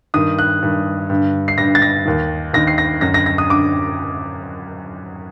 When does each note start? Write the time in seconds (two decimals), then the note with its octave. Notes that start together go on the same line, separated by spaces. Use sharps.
0.14 G2 D#3 D#6
0.39 F#6
0.62 G2 D#3
1.10 G2 D3
1.48 C7
1.58 G2 A#6
1.63 D3
1.75 A6
1.82 A#6
2.05 D#2 D#3
2.53 D#2 D#3 A#6
2.67 C7
2.78 A#6
3.01 F#2 D3 A#6
3.14 A#6
3.26 A#6
3.38 D#6
3.49 D3 D6